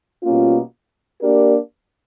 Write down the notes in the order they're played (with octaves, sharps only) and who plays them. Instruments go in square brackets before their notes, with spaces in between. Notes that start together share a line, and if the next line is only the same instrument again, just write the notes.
[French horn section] B2 G3 A#3 C#4 F4
A#3 D4 G4 A#4 D5